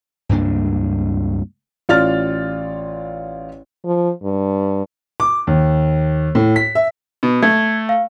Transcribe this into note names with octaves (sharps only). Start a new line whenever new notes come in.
C#2 G2 A#3 D4
A1 F4 D5 F6 A6
F3
G2
D6
D#2
A2
B6
E5
B2
A3 G#6
F5